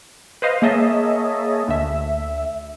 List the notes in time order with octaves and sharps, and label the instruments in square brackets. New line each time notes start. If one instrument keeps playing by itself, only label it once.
[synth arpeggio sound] B4 C5 D#5 F5
A#3 G#4 C#5 D#5 E5 A5
D2 E5